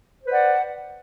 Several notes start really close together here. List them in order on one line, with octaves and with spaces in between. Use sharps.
C5 B4 D5 F#5